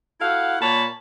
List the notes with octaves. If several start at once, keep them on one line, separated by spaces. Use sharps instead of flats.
E4 F#4 A4 F5 F#5
A#2 A#3 C#5 A5 B5